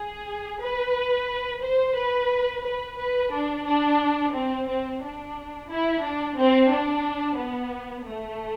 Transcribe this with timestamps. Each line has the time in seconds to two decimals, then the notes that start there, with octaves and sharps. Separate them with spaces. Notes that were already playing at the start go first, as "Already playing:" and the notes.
Already playing: G#4
0.60 B4
1.61 C5
1.95 B4
2.63 B4
2.97 B4
3.31 D4
3.65 D4
4.32 C4
4.66 C4
5.00 D4
5.68 E4
6.01 D4
6.36 C4
6.70 D4
7.37 B3
8.05 A3